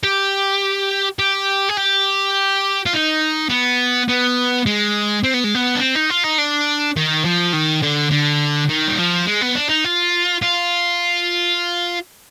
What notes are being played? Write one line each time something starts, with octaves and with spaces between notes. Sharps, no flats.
G4
G4
G#4
G4
F4
D#4
B3
B3
G#3
C4
B3
G#3
B3
D4
C4
D#4
F4
D#4
D4
D#3
F3
D#3
D3
D3
D#3
G3
F3
G#3
B3
D4
D#4
F4
F4